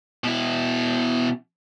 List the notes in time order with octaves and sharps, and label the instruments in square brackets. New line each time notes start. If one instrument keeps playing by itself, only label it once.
[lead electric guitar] B2 E4